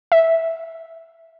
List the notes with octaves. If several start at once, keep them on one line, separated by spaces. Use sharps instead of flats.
E5